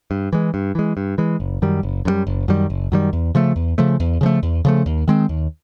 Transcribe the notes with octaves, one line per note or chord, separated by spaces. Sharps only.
G2
E3 G#3
G2
E3 G#3
G2
E3 G#3
F#1
F#2 D#3 G3
F#1
F#2 D#3 G3
F#1
F#2 D#3 G3
F#1
F#2 D#3 G3
E2
C#3 F3 A3
E2
C#3 F3 A3
E2
C#3 F3 A3
E2
C#3 F3 A3
D#2
D#3 G#3 C4
D#2